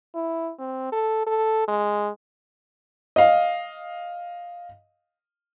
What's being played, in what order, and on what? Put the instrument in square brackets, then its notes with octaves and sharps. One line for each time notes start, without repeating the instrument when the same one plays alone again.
[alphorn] E4
C4
A4
A4
G#3
[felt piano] D#5 F5